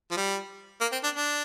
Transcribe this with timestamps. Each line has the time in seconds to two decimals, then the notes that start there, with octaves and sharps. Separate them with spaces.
0.11 F3
0.17 G3
0.82 A#3
0.92 C4
1.04 D4
1.15 D4